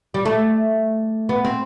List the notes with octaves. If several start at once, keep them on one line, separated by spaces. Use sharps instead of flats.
G3
A3
B3
C4